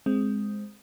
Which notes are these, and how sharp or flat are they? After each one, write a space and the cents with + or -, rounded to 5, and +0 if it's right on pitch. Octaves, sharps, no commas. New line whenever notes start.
G#3 +0 C4 +0